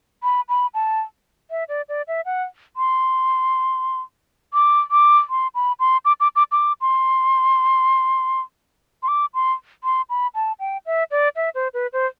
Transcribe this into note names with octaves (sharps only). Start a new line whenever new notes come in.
B5
B5
A5
E5
D5
D5
E5
F#5
C6
D6
D6
C6
B5
C6
D6
D6
D6
D6
C6
C6
D6
C6
C6
B5
A5
G5
E5
D5
E5
C5
B4
C5